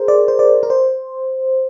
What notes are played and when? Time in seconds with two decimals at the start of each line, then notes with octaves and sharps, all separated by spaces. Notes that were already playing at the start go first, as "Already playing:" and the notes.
Already playing: G#4 A#4 C5
0.08 D5
0.28 C5
0.39 D5
0.63 A#4
0.70 C5